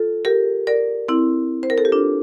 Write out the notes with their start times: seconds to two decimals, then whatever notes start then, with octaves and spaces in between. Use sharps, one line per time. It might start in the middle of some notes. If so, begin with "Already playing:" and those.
Already playing: F4 A4
0.25 G4 A#4
0.67 A#4 D5
1.09 C4 E4
1.63 C5
1.70 A#4
1.78 A4
1.85 G4
1.92 D4 F4